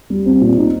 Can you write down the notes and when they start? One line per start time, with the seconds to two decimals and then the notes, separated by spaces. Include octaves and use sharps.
0.10 G3
0.26 C4
0.41 A#2
0.58 D#4